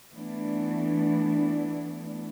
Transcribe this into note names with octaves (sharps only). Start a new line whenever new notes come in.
E3 A3 B3 D4